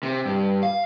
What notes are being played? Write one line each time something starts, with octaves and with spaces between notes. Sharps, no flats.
C3
G2
F5